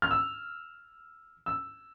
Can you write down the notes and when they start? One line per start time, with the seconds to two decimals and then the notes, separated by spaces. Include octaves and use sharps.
0.02 F6
0.11 E6
1.46 E6